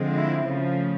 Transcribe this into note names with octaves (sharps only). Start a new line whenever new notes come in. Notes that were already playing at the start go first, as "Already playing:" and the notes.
Already playing: D3 F3 G#3 C4
E4
C#3 F3 A3